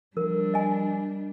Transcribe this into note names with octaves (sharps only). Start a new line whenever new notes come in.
F3 G3 D4 A#4
D#5 G#5